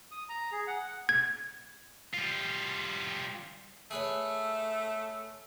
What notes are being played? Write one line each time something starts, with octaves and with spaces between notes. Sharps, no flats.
D#6
A#5
G#4
F#5
G#6
G3 F4
A3 G#4 B4 C#5